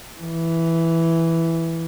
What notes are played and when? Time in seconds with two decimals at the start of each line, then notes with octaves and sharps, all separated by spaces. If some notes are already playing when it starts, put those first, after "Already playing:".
0.19 E3